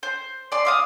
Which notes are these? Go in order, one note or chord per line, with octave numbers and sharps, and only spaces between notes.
C5
D5 C6
E5 F5 D#6